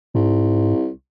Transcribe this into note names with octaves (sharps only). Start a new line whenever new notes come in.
C2 G#2